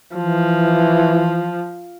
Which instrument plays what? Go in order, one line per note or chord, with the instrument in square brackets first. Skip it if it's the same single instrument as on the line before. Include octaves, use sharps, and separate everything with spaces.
[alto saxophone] E3 [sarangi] F3